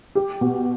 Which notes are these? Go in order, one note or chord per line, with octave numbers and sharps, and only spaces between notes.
G4
B2